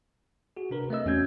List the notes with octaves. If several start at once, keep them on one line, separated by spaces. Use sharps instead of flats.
F#4 G#4
C3 D4 A#4 B4
A3 C4 D#5 E6
E2 C#4 F#4 G6 G#6